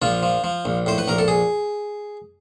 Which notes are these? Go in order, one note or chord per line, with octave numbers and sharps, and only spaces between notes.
A#1 F3 F4
F3
F3
A#1
A2 C5
B4
A#1 A#4
A4
G#4